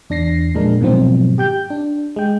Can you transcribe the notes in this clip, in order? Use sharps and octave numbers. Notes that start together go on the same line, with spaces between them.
E2 D4 A#6 C7
A#2 F3 G#3 D4 A#4
G#2 B2 D#3 F3 F#3 C4
G4 G5 G6
D4
G#3 G5